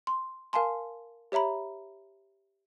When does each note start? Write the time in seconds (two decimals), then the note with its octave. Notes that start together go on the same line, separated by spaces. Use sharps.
0.07 C6
0.53 A#4 F5 G#5 A5 C6
1.32 G4 C#5 E5 A#5 B5